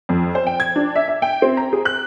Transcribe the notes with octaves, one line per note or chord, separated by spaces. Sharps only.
F2
C5
G5
G#6
D4
E5
E5
G5
C4
A#5
G#4
F#6